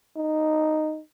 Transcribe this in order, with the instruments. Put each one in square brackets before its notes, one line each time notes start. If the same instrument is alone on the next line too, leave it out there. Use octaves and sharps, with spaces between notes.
[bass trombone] D#4